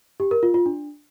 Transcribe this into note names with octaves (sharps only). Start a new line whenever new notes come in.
G4
A#4
F4
F4
D4